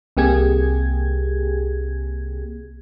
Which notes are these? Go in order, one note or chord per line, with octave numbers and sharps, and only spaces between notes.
C2 C3 A#3 G4 G#4 G#6